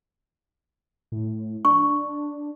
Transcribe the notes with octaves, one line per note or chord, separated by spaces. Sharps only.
A2
D4 C#6